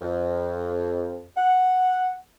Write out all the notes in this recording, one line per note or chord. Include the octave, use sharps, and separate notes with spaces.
F2
F#5